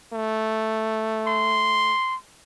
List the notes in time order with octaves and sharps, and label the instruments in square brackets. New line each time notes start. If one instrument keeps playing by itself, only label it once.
[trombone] A3
[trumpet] C6